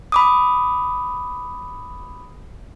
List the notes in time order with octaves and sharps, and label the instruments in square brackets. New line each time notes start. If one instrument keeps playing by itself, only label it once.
[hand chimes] B5 D6 D#6